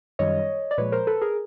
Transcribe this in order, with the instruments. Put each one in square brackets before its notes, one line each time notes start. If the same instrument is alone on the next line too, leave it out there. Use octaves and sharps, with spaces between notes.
[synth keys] F#2 D#3 G3 C#5 D#5
D5
A#2 F3 G#3 B4 C#5
A#4 C5
A4 B4
G#4 A#4